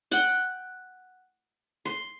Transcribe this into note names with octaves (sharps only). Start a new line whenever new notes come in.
F#5 G5
C6